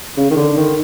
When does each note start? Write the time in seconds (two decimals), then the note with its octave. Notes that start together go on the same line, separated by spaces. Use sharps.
0.17 C#3
0.30 D#3
0.36 D3
0.57 D#3